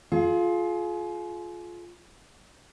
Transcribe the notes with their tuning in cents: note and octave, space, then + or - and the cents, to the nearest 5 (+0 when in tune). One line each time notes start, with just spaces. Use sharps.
F4 +5 G#4 +35